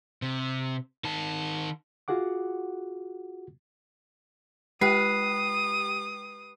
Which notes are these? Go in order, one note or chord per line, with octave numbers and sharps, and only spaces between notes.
C3
D#3 A5
F4 F#4 G#4 F#5 D6
G#3 G4 B4 G5 D#6 C7